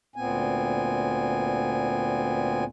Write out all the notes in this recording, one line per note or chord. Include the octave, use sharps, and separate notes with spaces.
D2 A#2 B3 C4 G#5